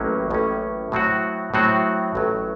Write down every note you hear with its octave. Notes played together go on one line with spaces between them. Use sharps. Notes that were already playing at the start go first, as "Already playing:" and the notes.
Already playing: A1 A2 F#3 A#3 C#4
A1 A2 F#3 A#3 C#4
A2 F#3 C4 F#4
A2 F#3 C4 F#4
A1 A2 F#3